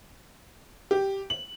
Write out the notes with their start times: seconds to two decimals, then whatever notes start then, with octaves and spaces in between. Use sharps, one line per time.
0.91 G4
1.30 F#7